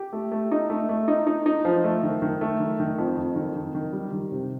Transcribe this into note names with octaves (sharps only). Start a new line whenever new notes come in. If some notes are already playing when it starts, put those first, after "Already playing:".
Already playing: G4
A3
A3
D#4
A3
A3
D#4
D#4
D#4
F3
A3
D#3
D#3
A3
D#3
D#3
F2
F2
D#3
D#3
D#3
G3
D#3
C3